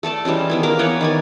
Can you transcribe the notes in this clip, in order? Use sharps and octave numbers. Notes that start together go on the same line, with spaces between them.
A3 A4 D5 A5
E3 G3 G#3 C#4
D#3 B3 E4
A#3 A#4 D6
E3 B3 B4 C#5
D#3 D5 G#5